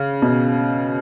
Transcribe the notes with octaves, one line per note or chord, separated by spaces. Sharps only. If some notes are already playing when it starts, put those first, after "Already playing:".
Already playing: C#3
B2